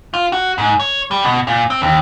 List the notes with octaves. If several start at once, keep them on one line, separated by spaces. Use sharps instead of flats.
F4
F#4
G#2
C#5
G3
B2
A#2
C4
D#2